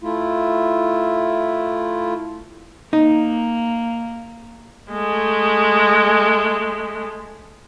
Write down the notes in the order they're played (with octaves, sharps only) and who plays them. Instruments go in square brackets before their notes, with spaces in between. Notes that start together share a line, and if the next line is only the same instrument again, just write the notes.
[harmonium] A3 E4 F4
[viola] A#3 [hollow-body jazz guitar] D#4
[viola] G#3 A3